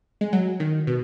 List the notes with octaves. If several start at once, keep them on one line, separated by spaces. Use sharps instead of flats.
G#3
F#3
D#3
B2